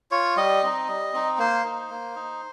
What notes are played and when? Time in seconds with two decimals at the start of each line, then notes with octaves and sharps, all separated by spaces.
0.11 F4 C#5
0.37 G3 D#5
0.63 C4 D#4
0.88 G3
1.13 C4 D#4
1.38 A#3 C5
1.65 D#4
1.90 A#3
2.16 D#4